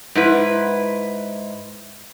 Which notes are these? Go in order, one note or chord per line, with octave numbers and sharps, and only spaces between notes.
G#2 E4 B4